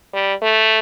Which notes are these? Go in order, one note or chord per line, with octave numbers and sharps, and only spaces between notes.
G3
A3